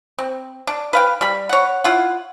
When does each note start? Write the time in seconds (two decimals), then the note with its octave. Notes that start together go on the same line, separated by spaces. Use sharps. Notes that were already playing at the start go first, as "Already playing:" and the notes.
0.18 C4
0.67 D4
0.93 B4 F5 G5
1.21 G3 B5
1.49 C#5 F#5
1.84 E4 F4 F#5